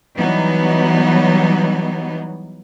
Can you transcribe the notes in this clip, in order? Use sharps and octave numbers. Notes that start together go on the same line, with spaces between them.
E3 F#3 G3 B3 D#4